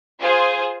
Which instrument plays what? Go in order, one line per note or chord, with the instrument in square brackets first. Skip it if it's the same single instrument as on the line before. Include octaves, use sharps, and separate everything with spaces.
[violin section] F4 G#4 C5